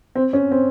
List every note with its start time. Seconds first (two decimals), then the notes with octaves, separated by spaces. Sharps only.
0.15 C4
0.33 C#4
0.51 C4